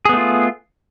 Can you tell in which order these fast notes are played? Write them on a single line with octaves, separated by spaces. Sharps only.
G#4 B3 A3 F4